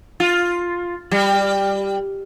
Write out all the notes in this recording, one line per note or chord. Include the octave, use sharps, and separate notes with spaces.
F4
G3